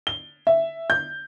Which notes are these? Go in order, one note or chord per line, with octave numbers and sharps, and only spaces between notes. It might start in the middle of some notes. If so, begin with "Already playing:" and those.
G7
E5
G6